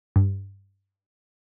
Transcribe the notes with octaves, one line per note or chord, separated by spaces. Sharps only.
G2